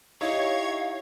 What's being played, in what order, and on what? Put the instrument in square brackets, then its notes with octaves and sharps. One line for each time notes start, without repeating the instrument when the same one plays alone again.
[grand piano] D#4 E4 G4 [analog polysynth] C#5 G#6 [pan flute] F5